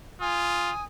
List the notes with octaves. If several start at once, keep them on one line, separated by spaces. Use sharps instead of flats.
F4 G#5 D#6